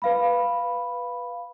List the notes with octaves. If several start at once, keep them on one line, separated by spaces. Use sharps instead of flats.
B4 F5 B5